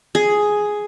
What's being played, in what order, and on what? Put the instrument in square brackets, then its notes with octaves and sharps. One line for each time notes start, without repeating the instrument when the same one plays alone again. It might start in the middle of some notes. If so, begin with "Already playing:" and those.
[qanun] G#4